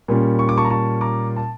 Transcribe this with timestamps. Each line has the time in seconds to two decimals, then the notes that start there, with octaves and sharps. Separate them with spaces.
0.08 A#2 G3 C#4
0.39 C#6
0.49 D6
0.57 A5 C#6
0.65 A#5
0.70 A5 C#6
1.01 A#5 D6
1.36 A5